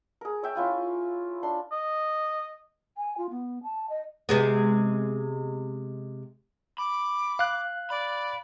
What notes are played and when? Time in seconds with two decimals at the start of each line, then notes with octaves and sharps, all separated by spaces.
0.21 G#4 A#4
0.43 C#5 E5 G5
0.55 C#4 E4 F4 G#5
1.43 D4 C6
1.72 D#5
2.97 G#5
3.18 F4
3.30 B3
3.63 A5
3.89 D#5
4.29 C3 G#3 B3
6.78 B5 D6
7.39 F5 F#6
7.90 D5 B5